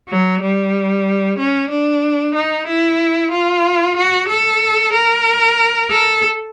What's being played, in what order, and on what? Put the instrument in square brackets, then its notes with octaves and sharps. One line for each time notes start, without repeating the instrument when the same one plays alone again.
[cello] F#3
G3
C#4
D4
D#4
E4
F4
F#4
A4
A#4
A4